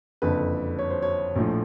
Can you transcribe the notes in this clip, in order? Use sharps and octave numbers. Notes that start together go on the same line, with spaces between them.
F#1 F2 D3 B4
C#5
C5
C#5
A#1 A2 F3